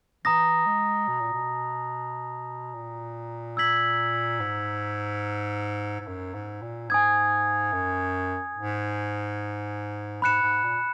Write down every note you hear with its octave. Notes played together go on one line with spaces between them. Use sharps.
E3 A#5 D#6 A#6
G#3
B2
A#2
B2
A#2
E6 G#6 B6 F#7
G#2
G#2
F#2
G#2
A#2
G#2 G#5 D#6 G#6
F#2
G#2
G#2 B5 F#6 C#7 E7
G#2
A#2